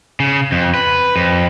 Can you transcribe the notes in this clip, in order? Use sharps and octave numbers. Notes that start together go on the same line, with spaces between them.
C#3
F2
B4
F2